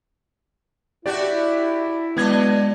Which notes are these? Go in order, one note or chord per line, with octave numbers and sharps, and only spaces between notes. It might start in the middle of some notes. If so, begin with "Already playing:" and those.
D4 E4 F#4 G4 D5
F#3 G#3 B3 D4 D#5 G#6